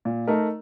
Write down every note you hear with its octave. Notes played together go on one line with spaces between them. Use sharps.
A#2
A3 D#4 A#4 D#5